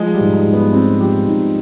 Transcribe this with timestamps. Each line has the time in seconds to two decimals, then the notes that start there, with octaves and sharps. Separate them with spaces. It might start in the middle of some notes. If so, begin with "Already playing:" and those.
Already playing: F3 G#3
0.14 G3
0.20 G#2
0.33 G#3
0.47 G#2
0.53 B3
0.73 F3 C4
1.00 F3 G4
1.27 G#2 D#4